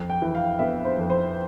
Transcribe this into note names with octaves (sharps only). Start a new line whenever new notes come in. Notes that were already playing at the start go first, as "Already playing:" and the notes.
Already playing: F2
G5
E3
F5
B3 E5
C5
F2
C5